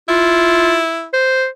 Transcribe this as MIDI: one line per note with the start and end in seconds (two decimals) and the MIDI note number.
0.09 1.06 64
0.09 0.80 65
1.13 1.47 72